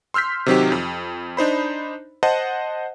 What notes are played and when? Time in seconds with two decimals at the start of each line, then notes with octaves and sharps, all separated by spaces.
0.14 C6 E6 F6 G6 B6
0.46 C3 D#3 F#3 C4 D#4 G4
0.72 F2
1.37 D4 D#4 C5 B5
2.23 C5 D#5 F#5 A5